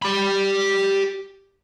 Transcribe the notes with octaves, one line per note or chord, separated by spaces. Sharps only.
G4 B5